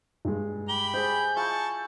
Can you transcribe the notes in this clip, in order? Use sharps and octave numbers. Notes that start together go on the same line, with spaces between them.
G2 G#3
G4 B5 G7
G#4 C5 D#5 G#5 G6
G#3 E4 F4 A5 C#6